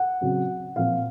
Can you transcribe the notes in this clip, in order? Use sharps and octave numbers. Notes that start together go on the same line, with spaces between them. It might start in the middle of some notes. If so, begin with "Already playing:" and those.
Already playing: F#5
C#3 F#3 C4
A#2 F3 C4 F5